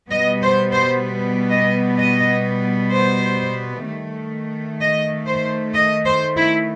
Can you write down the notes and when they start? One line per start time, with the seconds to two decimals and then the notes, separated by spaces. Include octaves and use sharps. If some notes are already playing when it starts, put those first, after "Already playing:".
0.10 B2 G3 B3 D#5
0.42 C5
0.72 C5
1.50 D#5
1.98 D#5
2.92 C5
3.86 D#3 A3
4.80 D#5
5.26 C5
5.73 D#5
6.06 C5
6.36 E4